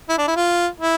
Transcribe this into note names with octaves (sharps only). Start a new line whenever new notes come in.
E4
D4
E4
F4
E4